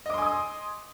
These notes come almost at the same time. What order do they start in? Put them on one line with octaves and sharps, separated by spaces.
D#5 D6 C6 G#5 D#6